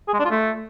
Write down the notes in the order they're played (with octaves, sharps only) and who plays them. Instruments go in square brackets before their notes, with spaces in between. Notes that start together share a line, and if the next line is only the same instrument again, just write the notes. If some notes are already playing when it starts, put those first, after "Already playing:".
[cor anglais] G#4
G#3
D4
F4
A3